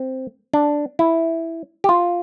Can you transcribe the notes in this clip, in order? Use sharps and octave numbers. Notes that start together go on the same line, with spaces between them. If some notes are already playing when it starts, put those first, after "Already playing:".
Already playing: C4
D4
E4
G4
F4